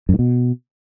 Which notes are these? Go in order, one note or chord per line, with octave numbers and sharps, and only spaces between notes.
F#2
G#2
B2